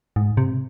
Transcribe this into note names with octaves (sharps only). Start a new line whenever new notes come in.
G#2
C3